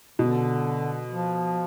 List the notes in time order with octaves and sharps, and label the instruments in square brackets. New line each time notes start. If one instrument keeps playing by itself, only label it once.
[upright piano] B2 [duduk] D3
[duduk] F3